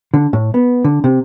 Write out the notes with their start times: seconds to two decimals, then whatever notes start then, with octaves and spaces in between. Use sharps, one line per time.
0.14 D3
0.33 A2
0.54 B3
0.84 D3
1.04 C3